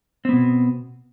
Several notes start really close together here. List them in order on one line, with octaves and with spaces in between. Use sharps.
C4 B3 B2